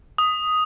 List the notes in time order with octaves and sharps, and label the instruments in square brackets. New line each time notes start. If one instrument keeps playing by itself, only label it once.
[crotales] D#6